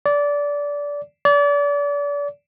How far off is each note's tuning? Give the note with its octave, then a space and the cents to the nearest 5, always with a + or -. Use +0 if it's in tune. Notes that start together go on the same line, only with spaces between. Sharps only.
D5 -20
D5 -35